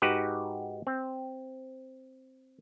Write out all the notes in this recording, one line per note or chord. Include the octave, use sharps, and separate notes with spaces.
G#2 D#4 F#4 G4 B4
C4